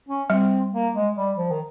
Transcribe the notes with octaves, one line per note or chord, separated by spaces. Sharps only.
C#4
G3 C4
A#3
G#3
G3
F3
D#3